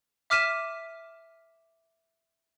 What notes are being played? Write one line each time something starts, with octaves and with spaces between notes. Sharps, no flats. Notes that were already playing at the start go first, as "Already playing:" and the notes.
E5 D6 F6 B6 D#7 E7